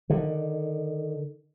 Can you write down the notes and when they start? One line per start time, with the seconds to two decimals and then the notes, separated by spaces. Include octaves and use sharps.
0.10 D3 D#3